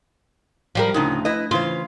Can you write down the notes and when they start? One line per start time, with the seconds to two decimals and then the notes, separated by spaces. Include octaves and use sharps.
0.75 F3 G3 A#4
0.94 D2 A2 C#3 D#4
1.25 E4 B4 D#5
1.51 C#3 E3 F4 C5